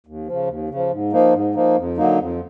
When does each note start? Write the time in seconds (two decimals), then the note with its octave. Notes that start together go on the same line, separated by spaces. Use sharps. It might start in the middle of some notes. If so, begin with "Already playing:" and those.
0.07 D#2
0.27 C#3 F3
0.48 D#2
0.70 C#3 F3
0.91 G#2
1.13 F3 A#3 D#4
1.34 G#2
1.55 F3 A#3 D#4
1.77 F2
1.97 D3 F#3 A#3 D#4
2.19 F2